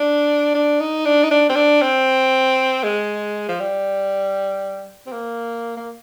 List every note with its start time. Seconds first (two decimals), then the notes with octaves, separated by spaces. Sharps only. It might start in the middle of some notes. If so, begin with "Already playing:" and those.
Already playing: D4
0.55 D4
0.80 D#4
1.05 D4
1.23 D#4
1.31 D4
1.49 C4
1.55 D4
1.82 C4
2.84 G#3
3.49 F3
3.60 G3
5.07 C4
5.12 A#3
5.77 A#3